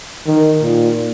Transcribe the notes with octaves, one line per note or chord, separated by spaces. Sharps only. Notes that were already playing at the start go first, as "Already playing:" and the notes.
D#3
A#2